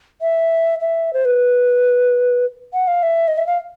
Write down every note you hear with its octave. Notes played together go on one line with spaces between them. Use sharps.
E5
E5
C5
B4
F#5
F5
E5
D#5
E5
F5